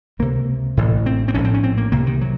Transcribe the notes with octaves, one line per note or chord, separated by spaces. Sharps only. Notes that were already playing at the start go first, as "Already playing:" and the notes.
C#2 C3 A#3
A1 A2
C4
C4
A#1 A2 C#4
C4
C#4
C4
A#3
C2 C3 A#3
D#3
F#3